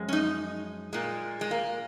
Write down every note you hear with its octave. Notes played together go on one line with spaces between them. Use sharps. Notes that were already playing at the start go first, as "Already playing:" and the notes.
Already playing: F#2 F3 G#3
C#4
D#4
A#2 G#3
G#3
A#3